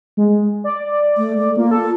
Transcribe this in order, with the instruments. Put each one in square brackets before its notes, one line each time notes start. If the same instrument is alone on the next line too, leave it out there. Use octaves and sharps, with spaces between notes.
[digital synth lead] G#3
D5
[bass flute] A3
A3
[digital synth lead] A#3 [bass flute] F4
[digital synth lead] A4